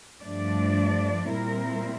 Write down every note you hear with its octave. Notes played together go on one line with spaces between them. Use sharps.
G2 F3 A3 D4 D5
A#2 G3 C4 E4 A#4